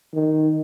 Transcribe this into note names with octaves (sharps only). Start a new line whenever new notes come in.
D#3